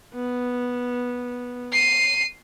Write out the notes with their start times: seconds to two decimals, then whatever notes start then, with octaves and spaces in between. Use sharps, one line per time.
0.14 B3
1.73 C7 D#7